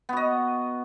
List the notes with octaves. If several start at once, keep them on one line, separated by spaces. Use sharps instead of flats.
B3 F#4 D#5